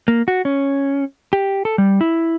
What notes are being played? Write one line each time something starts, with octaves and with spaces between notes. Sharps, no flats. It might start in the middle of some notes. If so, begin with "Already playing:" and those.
A#3
F#4
C#4
G4
A4
G3
E4